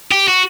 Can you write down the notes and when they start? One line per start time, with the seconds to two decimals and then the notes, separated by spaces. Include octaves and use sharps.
0.12 G4
0.28 F#4